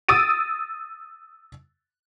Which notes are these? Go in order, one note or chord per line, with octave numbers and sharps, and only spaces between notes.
D#6 E6 A6 D7 D#7